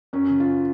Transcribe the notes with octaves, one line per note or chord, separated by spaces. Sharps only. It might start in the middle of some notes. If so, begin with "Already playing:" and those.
F#2 C#4
C#3
F4